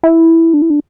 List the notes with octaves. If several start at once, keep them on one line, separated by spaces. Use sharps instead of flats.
E4
D4
E4
D4